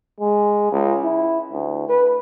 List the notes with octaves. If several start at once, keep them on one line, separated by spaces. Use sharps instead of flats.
G#3
C#2
E4
D2
B4